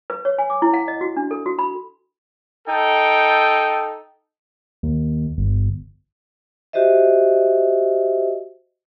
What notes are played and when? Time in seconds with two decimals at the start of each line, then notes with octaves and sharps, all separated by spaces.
0.10 B4
0.25 C#5
0.38 G#5
0.50 D6
0.62 E4
0.74 F#5
0.88 D#5
1.01 F#4
1.17 D4
1.31 A4
1.46 F#4
1.59 B5
2.68 D#4 A4 G5
4.83 D#2
5.38 G1
6.73 F#4 G4 C5 D#5 E5